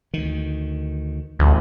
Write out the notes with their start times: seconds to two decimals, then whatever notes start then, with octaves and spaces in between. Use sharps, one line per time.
0.14 D2 D#3
1.39 A1 D2